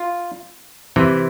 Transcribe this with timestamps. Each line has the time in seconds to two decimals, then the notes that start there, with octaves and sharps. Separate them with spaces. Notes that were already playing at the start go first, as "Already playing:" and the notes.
Already playing: F4
0.96 C3 E3